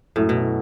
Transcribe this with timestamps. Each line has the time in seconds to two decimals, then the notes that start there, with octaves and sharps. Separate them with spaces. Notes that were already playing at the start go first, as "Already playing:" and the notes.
0.16 F#2 A2 F#3 A3 E4
0.29 B2